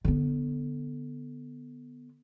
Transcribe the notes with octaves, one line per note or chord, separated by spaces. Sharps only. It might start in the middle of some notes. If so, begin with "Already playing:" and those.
D3 B3